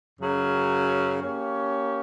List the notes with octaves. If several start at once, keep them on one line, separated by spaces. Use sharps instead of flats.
F#2 C#3 F#3 C#4
A#3 C#4 G4 C#5